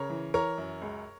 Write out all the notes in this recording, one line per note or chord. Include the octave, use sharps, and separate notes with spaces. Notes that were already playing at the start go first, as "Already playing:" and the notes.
Already playing: C#3 A#4 C#5
E3
E3 A#4 C#5
F#2
C#2